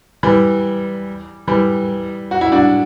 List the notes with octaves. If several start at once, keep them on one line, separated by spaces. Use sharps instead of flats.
E3 G3
E3 G3
F#4
E4
D4 F#4